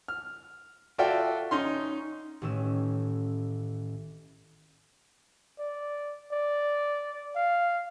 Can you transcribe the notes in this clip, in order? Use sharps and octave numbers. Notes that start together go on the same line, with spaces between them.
F6
F4 F#4 A4 D5 E5 G5
C#4 D#4 C6
A1 A2 D#3 C#4 E6
D5
D5
F5